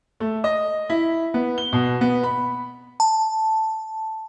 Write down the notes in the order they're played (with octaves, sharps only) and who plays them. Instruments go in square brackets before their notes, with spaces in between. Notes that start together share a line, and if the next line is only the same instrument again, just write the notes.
[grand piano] A3
D#5
E4
B3
G7
B2
B3
B5
[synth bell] A5